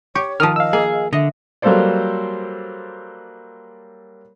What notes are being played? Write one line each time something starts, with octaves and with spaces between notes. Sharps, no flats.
G4 C#5 C#6
D#3 F3 A5 D#6 F6
D#5 F5 E6
A#3 G#4
D#5
D3 D#5 E5
F#3 G3 A#3 A4 C5 D5